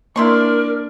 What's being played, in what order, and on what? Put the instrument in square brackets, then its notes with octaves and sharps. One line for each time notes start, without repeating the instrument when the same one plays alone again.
[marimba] A#3 [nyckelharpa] D4 D5 [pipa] E4 C6 C#6 [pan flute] A#4